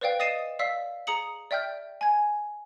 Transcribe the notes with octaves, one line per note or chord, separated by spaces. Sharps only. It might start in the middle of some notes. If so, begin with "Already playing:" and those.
B4 C5 D5 F5 G5
D#5 D#6 A6 C7 D#7 E7
D5 F5 E6 B6
G#4 A#5 D#6 C#7 F#7
D5 E5 G5 F6 G6
G#5 G#6